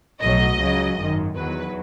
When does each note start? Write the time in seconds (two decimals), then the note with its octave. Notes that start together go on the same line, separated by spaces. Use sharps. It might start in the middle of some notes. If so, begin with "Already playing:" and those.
0.21 B1 A2 F#3 D#5
0.59 C#2 C#3 F#3
0.97 G#1 F#2 D#3
1.35 E2 D#3 F#3 B4